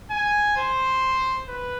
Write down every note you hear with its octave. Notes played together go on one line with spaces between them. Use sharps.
G#5
C5
B4